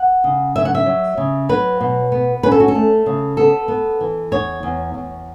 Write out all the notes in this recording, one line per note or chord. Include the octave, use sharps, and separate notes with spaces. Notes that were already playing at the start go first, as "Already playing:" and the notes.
Already playing: F#5
C#3
F#3 E5
F#5
E5
F#3
C#3
F#3 B4
B2
B3
C#4 B4
A4
F#4
A4
A3
C#3
B3 A4
B3
E3
E2 C#5
E2
E2